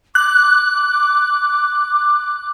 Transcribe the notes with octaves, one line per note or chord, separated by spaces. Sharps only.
D6 F#6